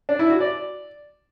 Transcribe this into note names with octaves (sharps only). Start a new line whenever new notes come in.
D4
E4
F#4
D5